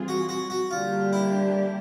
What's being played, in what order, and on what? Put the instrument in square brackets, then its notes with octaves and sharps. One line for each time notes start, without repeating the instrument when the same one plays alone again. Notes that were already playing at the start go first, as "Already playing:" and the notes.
Already playing: [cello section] E3 G3 C4 F4 G#4
[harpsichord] F#4
F#4
F#4
[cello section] D3 G3 A#3 D4 G4 [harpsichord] F4
[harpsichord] E4